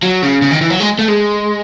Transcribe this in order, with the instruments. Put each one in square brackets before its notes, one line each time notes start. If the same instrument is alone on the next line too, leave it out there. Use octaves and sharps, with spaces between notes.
[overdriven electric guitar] F#3
C#3
C#3
D#3
E3
F#3
G#3
A3
G#3